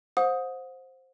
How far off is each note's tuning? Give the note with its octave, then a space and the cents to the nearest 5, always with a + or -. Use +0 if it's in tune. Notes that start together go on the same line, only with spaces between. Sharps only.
C5 +5 F#5 -40 D#6 +10